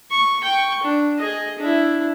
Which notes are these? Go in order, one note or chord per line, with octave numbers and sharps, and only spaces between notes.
C#6
G5 C#6
D4
G#4 D#5
D4 E4